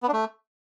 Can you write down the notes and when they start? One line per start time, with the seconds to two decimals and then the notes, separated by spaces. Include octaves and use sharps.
0.03 B3
0.08 D4
0.13 A3